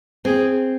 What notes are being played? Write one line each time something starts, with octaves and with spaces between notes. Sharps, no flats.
C4 G#4